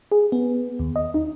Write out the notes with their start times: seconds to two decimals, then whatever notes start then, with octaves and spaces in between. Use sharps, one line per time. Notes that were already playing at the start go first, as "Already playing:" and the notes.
0.12 G#4
0.32 B3
0.79 D#2
0.96 D#5
1.14 D#4